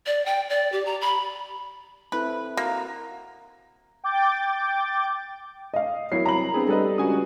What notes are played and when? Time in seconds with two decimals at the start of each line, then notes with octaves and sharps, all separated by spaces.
0.07 D5
0.26 G5
0.50 D5
0.72 G4
0.86 A#5
1.01 B5
2.12 C4 E4 A4 B4
2.57 A#3 F#4 A#5
4.04 G5 D6 G6 A6
5.74 D#5 F5
6.12 E2 F#3 E4 A#4 C#5 C7
6.26 C2 A#5 B5 F#7
6.54 G2 B3 C4 G#4
6.69 G3 A4 B4 D#5
6.98 C#2 F#4 G#5 D#6